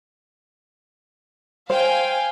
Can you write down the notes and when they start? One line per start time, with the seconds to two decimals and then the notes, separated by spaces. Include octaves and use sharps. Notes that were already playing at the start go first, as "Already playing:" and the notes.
1.70 C5 F5 G5 G#5